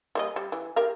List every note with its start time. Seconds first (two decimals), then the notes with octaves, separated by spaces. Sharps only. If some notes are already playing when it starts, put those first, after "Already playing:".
0.15 G3 A#3 D#5
0.36 G3
0.52 E3
0.76 G4 A#4 F5